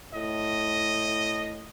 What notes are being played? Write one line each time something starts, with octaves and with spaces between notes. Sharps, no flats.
A2 D#5